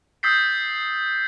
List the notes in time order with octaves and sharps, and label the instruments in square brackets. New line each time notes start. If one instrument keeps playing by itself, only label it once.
[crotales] D#6 E6 G6 A6 B6 C7